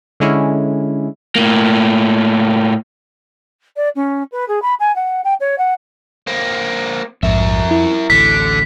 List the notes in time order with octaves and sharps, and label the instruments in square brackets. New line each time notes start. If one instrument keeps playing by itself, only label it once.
[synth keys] D3 G#3 C#4 E4
[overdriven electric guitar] A2 A#3
[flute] D5
C#4
B4
G#4
B5
G#5
F#5
G5
C#5
F#5
[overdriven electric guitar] A#3 C4
[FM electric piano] A#1 G#2 [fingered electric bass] F2 [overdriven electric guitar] A#4 E5
[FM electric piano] E4
[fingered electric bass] A1 D2 [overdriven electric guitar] D3 [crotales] B6